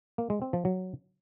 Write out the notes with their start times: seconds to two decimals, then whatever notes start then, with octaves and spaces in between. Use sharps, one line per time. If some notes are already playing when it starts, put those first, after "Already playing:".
0.18 A#3
0.30 G#3
0.42 C4
0.53 F3
0.65 F#3